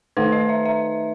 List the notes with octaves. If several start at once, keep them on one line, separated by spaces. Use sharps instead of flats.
D#3 A3 D#4 B4
D#5
E5
E5